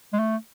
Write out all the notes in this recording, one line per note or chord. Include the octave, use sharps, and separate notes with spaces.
G#3
A3